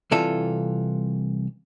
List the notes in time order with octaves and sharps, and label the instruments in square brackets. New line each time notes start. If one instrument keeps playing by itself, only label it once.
[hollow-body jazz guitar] C2 C3 E3 F4 A4 E5